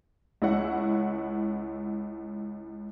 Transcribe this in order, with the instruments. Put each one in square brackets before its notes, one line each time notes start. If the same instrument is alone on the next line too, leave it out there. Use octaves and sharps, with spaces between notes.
[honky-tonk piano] C#2 E4 C#5 F#5